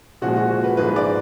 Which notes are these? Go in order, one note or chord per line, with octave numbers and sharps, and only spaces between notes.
A#2 F3 G#3 F#4
F#4
F#4
B4
G#2 F3 G#3 B4
D5